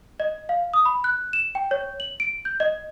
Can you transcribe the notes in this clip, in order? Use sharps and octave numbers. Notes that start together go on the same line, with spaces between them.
D#5
F5
D#6
B5
F#6
E7
G5
C#5
F#7
D7
G6
D#5